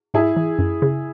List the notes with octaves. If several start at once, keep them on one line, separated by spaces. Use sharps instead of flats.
G#2 E4 G#4
E3
F#2
C#3